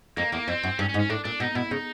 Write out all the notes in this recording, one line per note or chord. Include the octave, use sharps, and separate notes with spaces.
F2 A#3
E2 A#3
F2 C4
F#2
G2 C#4
C#4
G#2
C#4
A2 D4
A#2 D4
B2 D#4
B2 E4
C#3 D#4